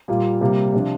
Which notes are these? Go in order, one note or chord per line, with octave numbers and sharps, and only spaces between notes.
A#2 G3 A#3 F4
C3 G3 A#3
C3 F3 D4 F4